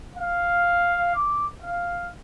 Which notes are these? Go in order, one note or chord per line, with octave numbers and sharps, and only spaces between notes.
F5
D6
F5